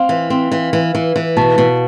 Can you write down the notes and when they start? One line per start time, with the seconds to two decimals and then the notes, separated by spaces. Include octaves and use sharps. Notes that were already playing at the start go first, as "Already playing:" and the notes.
Already playing: C4 F5
0.09 E3
0.30 C4
0.52 E3
0.73 E3
0.95 E3
1.16 E3
1.37 B2 A5
1.58 B2